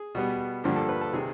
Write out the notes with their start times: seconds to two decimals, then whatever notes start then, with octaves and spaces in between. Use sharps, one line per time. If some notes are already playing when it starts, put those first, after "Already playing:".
Already playing: G#4
0.15 B2 G3 B3
0.64 G2 D3 F3 A#3 G4
0.76 A4
0.89 B4
1.01 A4
1.13 C3 D#3 G#4